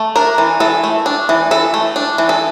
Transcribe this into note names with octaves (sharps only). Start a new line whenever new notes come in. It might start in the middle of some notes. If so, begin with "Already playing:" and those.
Already playing: A3
D4 A#4
E3
E3 A4
A3
D4
E3
E3 A4
A3
D4
E3
A4